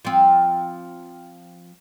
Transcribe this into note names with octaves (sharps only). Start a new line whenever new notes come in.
F3 C4